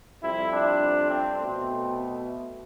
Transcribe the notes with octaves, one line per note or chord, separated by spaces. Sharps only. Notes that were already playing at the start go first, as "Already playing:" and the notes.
F2 C3 G3 C4 E4
D4
C4
B2 A3 C4